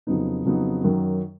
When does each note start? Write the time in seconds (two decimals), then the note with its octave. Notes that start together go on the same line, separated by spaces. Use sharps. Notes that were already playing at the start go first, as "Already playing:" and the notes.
0.07 F2 C#3 F#3 B3 D#4
0.45 F2 C#3 F#3 B3 D#4
0.83 F#2 D#3 F#3